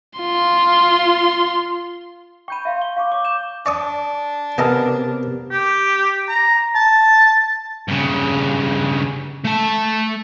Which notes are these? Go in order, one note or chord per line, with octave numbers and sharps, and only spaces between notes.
F4 C6
G5 B5 C#6 G6 D#7
E5 F5 C6
G7
F5 C#6 D6
C#5 C#6 D6
D6 G6 E7
D4 D5 C#6 D#6
C3 B3 A4 A#4 D#5 G#5 F6
G4
A#5
A5
G2 C#3
A3 A5